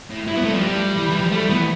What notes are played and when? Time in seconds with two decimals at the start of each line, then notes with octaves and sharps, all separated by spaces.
0.10 A2
0.27 G2 E4
0.36 B3
0.44 G2 A3
0.53 F3
0.62 G3
0.96 E3
1.09 E3
1.20 F3
1.32 G3 A3
1.49 E3 B3